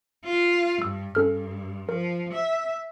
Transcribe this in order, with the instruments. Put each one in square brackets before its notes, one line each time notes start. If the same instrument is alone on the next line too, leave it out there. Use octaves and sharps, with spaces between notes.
[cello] F4
[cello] G2 [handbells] E6
[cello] G2 [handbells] C#4 A4 F6
[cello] F3 [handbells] A#4
[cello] E5